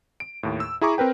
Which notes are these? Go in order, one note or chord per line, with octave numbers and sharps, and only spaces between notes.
D7
D#2 A2
E6
E4 G#4 A#5 C#6 D6
C4 A#4 B4 G5